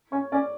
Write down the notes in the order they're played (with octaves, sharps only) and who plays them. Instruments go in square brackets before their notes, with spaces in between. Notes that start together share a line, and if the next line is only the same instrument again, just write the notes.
[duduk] C#4 [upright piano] C#5
[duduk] C#4 [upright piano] D5